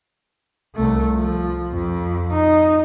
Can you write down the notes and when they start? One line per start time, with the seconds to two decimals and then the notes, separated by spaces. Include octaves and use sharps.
0.75 C2 A3
1.16 F3
1.72 F2
2.32 D#4